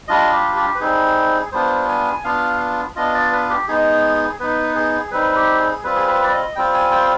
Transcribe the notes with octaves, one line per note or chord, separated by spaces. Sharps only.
G3 D4 F4 D#5
G4
G4
B4
G3 C4 D#4 G#4
G3 B3 D4 F4 C5
G#5
B3 D4 F4 F5
B3 D4 F4 D#5
D5
B4
G4
G#3 B3 D#4 G#4
B3 D#4 B4
G#4
G3 C4 D#4 B4
G4
G#4
G3 C4 F4 B4
G#4
B4
D5
D#5
G3 C4 F4 G5
G#5
G5